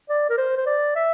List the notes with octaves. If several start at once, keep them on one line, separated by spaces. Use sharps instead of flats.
D5
A#4
C5
C5
D5
E5